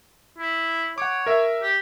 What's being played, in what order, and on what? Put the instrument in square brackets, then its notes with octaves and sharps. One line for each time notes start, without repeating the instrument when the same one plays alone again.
[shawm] E4
[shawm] C#5 [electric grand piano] F#5 D6
[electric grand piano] A#4 E5
[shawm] G4